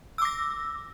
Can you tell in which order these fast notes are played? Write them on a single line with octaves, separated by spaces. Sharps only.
E6 D6 A#6